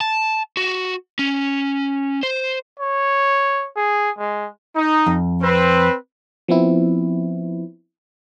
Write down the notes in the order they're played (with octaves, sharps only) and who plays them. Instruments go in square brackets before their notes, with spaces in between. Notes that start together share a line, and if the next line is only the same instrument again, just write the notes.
[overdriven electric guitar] A5
F#4
C#4
C5
[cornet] C#5
G#4
G#3
[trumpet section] D#4
[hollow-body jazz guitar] F2
[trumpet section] C4 B4
[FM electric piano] F3 B3 C4 E4